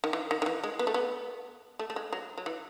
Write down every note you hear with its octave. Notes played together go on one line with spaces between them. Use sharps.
D#3
E3
D#3
D#3
E3
G#3
B3
A3
B3
A3
A3
G#3
F#3
F#3
E3